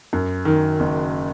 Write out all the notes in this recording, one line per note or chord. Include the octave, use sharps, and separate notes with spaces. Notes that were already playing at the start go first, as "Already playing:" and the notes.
F#2
D#3
F#1